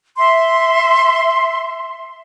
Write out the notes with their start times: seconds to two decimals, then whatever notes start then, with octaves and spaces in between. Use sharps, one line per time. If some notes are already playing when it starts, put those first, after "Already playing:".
0.18 E5 C6